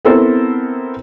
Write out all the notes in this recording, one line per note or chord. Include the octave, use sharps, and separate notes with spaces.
B3 C4 E4 A4 A#4 C5